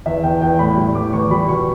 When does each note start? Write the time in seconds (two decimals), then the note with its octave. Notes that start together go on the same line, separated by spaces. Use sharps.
0.06 E2 E5
0.23 E2 G5
0.41 E2 G5
0.59 A2 B5
0.77 G3
0.94 A2 D6
1.13 E2 C#6
1.31 G3 B5
1.49 B2 C#6